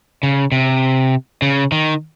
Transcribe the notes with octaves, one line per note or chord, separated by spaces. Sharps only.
C#3
C3
C#3
D#3